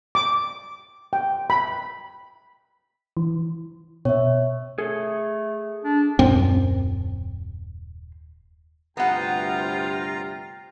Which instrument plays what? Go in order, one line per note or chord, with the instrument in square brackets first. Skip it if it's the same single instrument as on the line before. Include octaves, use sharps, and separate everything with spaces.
[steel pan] D6
G5
B5
[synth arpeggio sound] E3
[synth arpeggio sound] B2 [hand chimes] C#5 E5
[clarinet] A3 [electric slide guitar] G#4 A4
[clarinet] D4
[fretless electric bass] D#1 F#2 C4
[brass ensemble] D2 G2 G5 [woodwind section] C3 F4 [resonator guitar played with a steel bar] B3 F#5 [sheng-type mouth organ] A#5